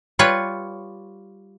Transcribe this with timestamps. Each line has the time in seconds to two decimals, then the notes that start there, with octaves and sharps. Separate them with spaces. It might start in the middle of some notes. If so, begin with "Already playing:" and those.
0.19 G3 F4 B4 C#5